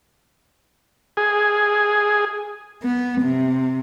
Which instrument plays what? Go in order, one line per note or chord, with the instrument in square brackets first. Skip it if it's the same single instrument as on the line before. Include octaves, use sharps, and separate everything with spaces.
[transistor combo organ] G#4
[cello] B3
C3